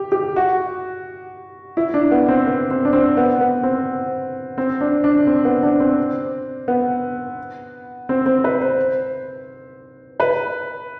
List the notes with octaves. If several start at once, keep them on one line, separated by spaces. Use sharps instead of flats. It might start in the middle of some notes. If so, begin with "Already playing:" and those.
Already playing: G4
G4
F#4
E4
D4
B3
C4
B3
C4
D4
C4
B3
B3
C4
C4
D4
D4
C4
B3
D4
C4
B3
C4
C4
B4
C5
B4